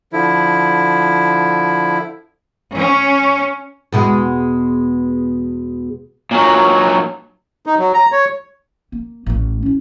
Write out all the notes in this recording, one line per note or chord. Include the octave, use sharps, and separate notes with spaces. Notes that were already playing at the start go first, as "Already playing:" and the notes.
D3 F3 E4
C#4
E2 B2 G#3
A#2 F#3
D#4
F#3
A#5
C#5
A#3
A1 A3
C#4 E4